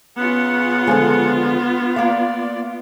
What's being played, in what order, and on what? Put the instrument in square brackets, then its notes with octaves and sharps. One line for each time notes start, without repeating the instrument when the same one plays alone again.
[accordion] C#3 F#5 [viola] B3 F4
[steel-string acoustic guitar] D3 F3 G#3
[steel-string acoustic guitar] A#3 F5 [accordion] D5